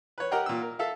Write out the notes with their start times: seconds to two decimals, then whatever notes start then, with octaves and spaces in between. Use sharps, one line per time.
0.18 B4 C#5
0.31 G4 A#4 D#5 F#5 G5
0.46 A#2 E6
0.62 A#4
0.79 A4 E5 F5